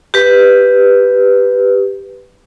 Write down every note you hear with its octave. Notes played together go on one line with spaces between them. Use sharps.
G4 B4